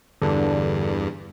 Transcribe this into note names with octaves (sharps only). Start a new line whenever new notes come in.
E2 G2 D3